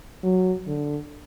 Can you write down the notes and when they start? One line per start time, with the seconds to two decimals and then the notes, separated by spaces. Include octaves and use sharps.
0.23 F#3
0.67 D3